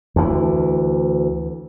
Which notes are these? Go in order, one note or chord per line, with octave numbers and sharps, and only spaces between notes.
D2 E3